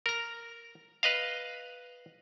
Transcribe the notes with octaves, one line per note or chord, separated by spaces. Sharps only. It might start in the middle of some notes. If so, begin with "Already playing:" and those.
A#4 A#5
B4 D#5 F5